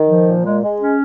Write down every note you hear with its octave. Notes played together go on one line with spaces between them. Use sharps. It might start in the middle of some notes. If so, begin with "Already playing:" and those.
Already playing: D#3
F3
A#2
G#3
G#3
C#4